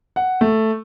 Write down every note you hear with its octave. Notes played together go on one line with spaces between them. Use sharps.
F#5
A3